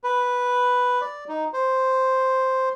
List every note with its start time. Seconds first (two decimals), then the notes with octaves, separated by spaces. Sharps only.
0.04 B4
1.01 D5
1.28 D#4
1.53 C5